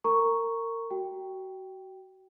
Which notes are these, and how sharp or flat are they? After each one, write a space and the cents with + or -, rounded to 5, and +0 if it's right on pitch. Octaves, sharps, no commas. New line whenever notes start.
A#4 -30 A#5 +0 C#6 +0
F#4 +30 G5 -5